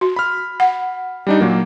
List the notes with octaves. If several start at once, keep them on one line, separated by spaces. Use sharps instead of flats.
F#4
B5 F6
F#5
G3 D4 D#4
A#2 F#3 A#3